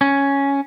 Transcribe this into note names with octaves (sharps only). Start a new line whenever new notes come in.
C#4